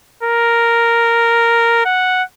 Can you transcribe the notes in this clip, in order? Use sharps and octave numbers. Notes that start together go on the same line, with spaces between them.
A#4
F#5